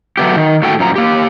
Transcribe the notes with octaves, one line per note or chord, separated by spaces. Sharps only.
F#3 A3 B3 G4
D#3
A2 F#4 A4 G5
F#2 F3 A#5
A#3 G4